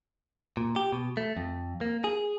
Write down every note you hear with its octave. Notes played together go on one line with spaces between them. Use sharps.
A#2
G4
B2
A3
F2
A#3
G#4